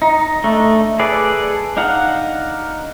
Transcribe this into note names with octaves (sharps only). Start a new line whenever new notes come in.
D#4
A3 D4 D#4
G#4 A4 B4 D5
D4 D#4 F5 F#5